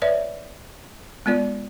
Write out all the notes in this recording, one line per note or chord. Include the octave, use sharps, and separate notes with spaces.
B4 C#5 D5 E5
G#3 B3 F4 D5